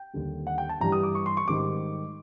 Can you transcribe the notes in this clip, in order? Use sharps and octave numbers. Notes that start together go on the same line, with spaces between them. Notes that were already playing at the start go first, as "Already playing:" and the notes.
Already playing: G5
D#2 D3 G3
F#5
G5
A5
G2 E3 G3 A#5
D#6
D6
C#6
C6
C#6
G#2 D#3 G3 D6